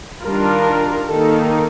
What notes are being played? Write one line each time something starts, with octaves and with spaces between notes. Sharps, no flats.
D#3 G3 D4 F4 A#4
D#3 A#3 D#4 A4